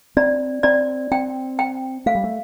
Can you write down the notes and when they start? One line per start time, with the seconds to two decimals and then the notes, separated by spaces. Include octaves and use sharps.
0.17 C4 D5
0.63 C4 D5
1.11 C4 G5
1.59 G5
2.06 A3 F5
2.15 G3
2.24 A3